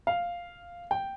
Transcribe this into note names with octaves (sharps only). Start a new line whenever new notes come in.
F5
G5